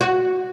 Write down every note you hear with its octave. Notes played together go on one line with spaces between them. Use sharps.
F#4